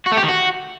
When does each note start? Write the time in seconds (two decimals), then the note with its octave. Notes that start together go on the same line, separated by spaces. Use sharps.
0.06 F#4
0.12 A3
0.18 G4
0.23 D#3
0.29 F#4